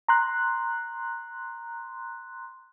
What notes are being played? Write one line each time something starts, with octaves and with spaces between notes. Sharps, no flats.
A#5 C6 F#6